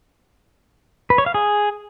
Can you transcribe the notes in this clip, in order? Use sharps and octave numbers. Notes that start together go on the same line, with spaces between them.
B4
C#5
F5
G#4